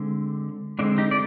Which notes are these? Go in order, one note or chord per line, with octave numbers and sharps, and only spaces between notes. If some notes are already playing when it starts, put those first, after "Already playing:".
Already playing: D3 G#3 C4
D3 G#3 C4 D4
D#4 G4
D5